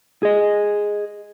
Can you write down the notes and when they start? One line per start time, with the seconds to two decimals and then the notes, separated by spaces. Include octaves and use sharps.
0.23 G#4 D#5